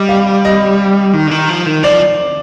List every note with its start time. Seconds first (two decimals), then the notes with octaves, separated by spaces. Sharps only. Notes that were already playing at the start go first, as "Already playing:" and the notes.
Already playing: G3 D#5
0.09 F5
0.45 D#5
1.13 D#3
1.27 D3
1.31 D#3
1.49 F3
1.66 D#3
1.83 F3 D5